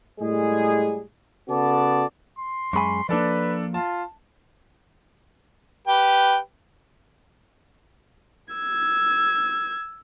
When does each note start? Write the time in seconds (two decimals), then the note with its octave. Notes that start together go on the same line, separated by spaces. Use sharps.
0.19 A2 G3 G#3 G#4
1.49 C#3 B3 F#4 A4 D5 A5
2.39 C6
2.73 F#2 G#3 G#5 B5 C#6
3.09 F3 A#3 D4 A4 B4 D5
3.74 F4 A5
5.87 G4 B4 G5
8.54 E6 G#6